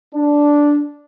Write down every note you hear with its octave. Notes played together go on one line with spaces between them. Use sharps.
D4